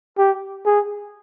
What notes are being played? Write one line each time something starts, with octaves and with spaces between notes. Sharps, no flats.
G4
G#4